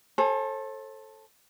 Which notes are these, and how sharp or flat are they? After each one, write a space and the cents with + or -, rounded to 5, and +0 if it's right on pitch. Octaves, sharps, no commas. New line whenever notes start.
A4 +0 C5 +45 G#5 +20